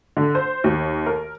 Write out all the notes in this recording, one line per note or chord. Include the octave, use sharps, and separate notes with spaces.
D3
C5
D#2
A#4